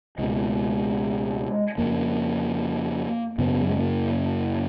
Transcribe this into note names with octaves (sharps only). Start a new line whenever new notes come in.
C#2 B2 G#3
F2 C#3 A#3
F#2 C#3 B3
F#3
G#3
A#3